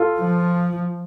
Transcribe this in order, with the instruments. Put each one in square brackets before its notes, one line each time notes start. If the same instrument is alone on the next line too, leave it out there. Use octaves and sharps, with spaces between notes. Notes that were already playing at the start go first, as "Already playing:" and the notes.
Already playing: [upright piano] F4 A4
[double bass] F3